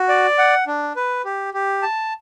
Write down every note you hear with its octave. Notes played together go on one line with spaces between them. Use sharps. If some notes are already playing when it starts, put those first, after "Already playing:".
Already playing: F#4
D5
F#5
D4
B4
G4
G4
A5